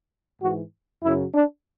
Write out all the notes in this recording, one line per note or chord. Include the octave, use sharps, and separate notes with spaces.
G#2 E3 F#4
F#2 C#3 F#3 E4
D4